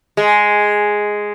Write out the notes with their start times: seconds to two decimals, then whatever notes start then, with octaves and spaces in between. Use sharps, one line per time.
0.17 G#3